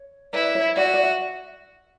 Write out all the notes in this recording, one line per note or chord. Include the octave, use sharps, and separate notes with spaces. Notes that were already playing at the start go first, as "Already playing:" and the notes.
Already playing: C#5
E4 B4 D5
C#5 E5
F#4 D5
E5
D5
E5